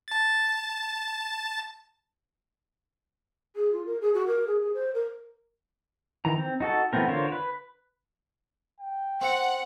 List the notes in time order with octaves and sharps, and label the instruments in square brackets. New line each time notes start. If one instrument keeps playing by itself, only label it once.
[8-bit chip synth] A5 A6
[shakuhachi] G#4
F4
A#4
G#4
F#4
A#4
G#4
G#4
C5
A#4
[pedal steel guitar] D#3 E3 A#5
C4
D#4 F#4 A4
E3 A3 B3 C4 A#4
D3 F4 A#4 C5 C#5
B4
[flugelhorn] G5
[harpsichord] C4 [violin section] F#5